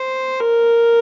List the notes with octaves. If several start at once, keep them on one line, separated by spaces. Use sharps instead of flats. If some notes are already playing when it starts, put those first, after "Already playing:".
Already playing: C5
A#4